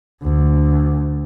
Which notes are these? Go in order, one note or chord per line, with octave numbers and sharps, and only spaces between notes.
D2